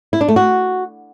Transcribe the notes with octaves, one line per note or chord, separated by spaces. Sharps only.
E4
D4
A3
F#4